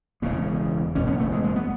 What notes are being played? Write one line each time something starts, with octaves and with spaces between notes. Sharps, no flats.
E1 E2 C#3 B3
F#1 E2 B2 C#4
B3
A3
G#3
G#3
B3